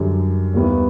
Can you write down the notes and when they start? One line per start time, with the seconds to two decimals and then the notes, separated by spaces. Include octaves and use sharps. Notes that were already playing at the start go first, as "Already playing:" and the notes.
Already playing: F#2 D3 G3
0.54 D#2 D#3 G3 B3 E4